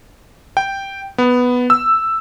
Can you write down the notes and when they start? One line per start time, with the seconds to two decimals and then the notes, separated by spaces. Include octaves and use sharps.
0.57 G5
1.18 B3
1.70 E6